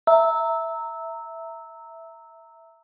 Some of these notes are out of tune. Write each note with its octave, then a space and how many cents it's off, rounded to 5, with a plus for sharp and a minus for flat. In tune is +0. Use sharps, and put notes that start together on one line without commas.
E5 +0 A#5 -20 E6 -15